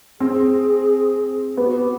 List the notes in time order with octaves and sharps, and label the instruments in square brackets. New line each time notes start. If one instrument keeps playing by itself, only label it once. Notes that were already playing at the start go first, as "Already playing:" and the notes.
[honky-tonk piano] C4 [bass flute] G#4
[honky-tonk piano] B3 [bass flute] G4
[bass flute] F#4
G4